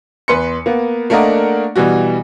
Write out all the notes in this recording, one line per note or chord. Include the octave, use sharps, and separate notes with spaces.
E2 B4 C6 C#7
A#3 B3
A3 A#3 D4 A#4 D#5 F#5
B2 E3 G3 F#4